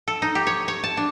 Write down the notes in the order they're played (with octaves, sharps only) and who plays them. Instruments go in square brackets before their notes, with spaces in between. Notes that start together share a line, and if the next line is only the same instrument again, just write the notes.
[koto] A4
D#4
G4
C#5
C#5
A5
D4